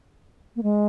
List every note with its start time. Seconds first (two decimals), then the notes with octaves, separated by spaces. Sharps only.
0.56 A#3
0.63 G#3